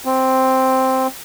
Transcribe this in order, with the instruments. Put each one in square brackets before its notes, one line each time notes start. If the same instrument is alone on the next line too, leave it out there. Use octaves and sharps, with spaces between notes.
[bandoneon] C4